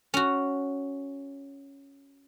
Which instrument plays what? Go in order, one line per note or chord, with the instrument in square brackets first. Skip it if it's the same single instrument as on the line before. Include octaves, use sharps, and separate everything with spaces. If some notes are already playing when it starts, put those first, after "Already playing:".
[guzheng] C#4 F#4